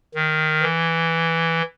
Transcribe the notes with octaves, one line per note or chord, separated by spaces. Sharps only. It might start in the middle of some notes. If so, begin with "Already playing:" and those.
D#3
E3